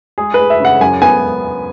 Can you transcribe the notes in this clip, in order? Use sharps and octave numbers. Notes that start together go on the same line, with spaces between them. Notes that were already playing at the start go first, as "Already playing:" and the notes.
G#3 G#4
B4
G#3
E5
C#3 F#5
F#2 G#5
B3 G#5